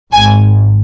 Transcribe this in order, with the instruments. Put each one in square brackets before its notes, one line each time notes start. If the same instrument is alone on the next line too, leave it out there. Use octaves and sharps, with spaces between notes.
[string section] G#1 G#5